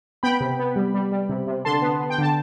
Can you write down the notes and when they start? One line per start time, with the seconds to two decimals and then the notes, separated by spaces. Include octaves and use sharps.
0.23 B3 G5 B5
0.40 C3
0.59 B3
0.76 G3
0.94 G3
1.12 G3
1.29 C3
1.47 C3
1.65 D3 A5 C6
1.82 B3
2.00 B3
2.10 G5
2.18 D3 A5